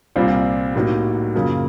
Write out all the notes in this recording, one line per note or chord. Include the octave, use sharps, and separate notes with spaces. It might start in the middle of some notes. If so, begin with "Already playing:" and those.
C2 A#2 G3 C4 F4
A2 F#3 A#3 D#4 G4
F#2 C#3 F3 A#3